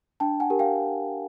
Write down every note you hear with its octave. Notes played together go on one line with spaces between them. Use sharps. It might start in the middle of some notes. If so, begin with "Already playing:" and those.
D4 G5 A5
F#5 G#5
G4 A#4
F5 G5